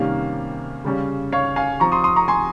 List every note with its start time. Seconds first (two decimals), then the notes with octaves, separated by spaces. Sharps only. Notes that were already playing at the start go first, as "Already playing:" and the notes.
Already playing: C3 D#3 G3 A#3 C#4 F5
0.84 C#3 G3 C#4
1.32 C#5 F5
1.56 F5 G#5
1.80 F3 C4 A#5 C#6
1.92 C6 D#6
2.04 C6 D#6
2.16 A#5 C#6
2.28 G#5 C6